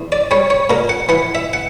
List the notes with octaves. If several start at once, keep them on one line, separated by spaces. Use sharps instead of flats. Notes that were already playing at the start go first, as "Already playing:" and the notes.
Already playing: E2
D5
G3 C#5
C#5
A#2 A#4
F#5
E3 F#5
E5
F#5